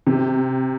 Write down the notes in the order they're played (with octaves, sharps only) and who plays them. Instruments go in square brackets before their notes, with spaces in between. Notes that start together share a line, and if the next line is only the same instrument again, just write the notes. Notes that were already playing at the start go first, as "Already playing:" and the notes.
[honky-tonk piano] C3